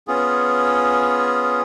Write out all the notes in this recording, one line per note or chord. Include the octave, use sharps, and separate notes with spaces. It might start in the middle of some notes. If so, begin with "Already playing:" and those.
B3 C#4 F4 G#4